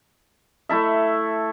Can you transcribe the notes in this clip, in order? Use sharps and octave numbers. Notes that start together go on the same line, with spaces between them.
A3 E4 A4 E5